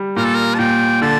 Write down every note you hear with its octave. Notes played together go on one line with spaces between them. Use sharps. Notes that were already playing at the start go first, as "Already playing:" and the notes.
Already playing: G3
A#2 A#4
A4
A#4
A5
A#2 G5
D3 A5